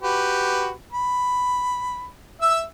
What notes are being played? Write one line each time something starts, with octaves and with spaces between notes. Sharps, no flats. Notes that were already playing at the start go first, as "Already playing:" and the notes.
F#4 G4 B4
B5
E5 E6